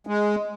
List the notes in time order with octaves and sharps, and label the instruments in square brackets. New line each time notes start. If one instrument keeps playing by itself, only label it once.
[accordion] G#3